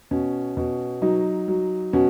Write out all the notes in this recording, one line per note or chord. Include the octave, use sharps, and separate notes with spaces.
B2 C#4
B2
F#3 D#4
F#3
B2 C#4 F#4